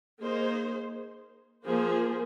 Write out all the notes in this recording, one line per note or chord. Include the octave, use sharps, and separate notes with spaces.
A#3 D#4 G#4 C5
F3 A#3 G#4 C5